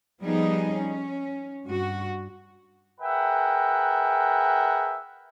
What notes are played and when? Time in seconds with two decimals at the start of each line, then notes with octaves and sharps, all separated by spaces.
0.22 F3 G3 B3 D#4 G#4 D#5
0.75 C#4
1.65 G2 F#4
3.01 G#4 A#4 B4 E5 F#5 G5